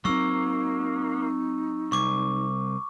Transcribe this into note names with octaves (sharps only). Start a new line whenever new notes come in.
F#3 A#3 C4 D#4 C#6 E6
C2 C#6 D6